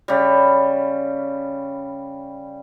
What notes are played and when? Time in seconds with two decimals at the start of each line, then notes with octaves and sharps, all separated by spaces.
0.08 C#3 G3